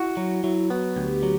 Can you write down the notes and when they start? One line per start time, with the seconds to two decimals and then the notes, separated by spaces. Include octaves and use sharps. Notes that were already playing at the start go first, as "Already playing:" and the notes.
Already playing: E4 F#4
0.17 F#3
0.44 F#3 E4
0.70 B3 F#4
0.97 D2 G4
1.23 F#3